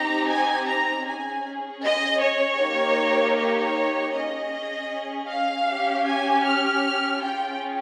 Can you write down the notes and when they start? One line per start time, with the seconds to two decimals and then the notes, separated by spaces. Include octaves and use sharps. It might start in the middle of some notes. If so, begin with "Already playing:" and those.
Already playing: C4 D#4 G4 A#5
0.28 G#5
0.66 A#5
1.05 C#4 G#4 G#5
1.82 D#5
2.21 C#5
2.59 A#3 D#4 G4
3.37 C#5
4.14 C#4 G#4 D#5
5.29 F5
5.68 C#4 G4
6.06 G#5
6.44 F6
7.21 C#4 F4 G#4 G5